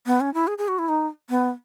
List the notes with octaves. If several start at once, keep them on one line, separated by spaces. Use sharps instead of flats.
B3
C#4
E4
G#4
G#4
F#4
E4
D#4
B3